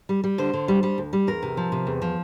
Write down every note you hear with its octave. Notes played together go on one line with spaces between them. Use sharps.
G3
G3
D3 C5
D3
G3
G3
D2
G3
E2 A#4
C3
F3
C3
E2
F3